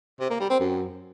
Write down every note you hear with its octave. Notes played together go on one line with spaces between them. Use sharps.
C3
A#3
G3
C4
F#2